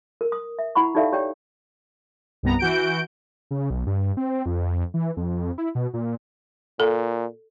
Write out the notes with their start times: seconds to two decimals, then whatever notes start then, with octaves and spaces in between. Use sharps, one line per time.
0.21 A#4
0.32 D#6
0.59 E5
0.75 E4 F#5 B5 C#6
0.95 D#4 G4 A4 D5 E5 F5
1.12 G4 C#5 D5 G5
2.43 C2 G2 B3 A#5
2.59 E3 F#4 G6 D7
3.51 C#3
3.70 B1
3.87 G2
4.17 C4
4.46 F2
4.94 E3
5.17 F2
5.58 E4
5.75 B2
5.94 A#2
6.80 A#2 A4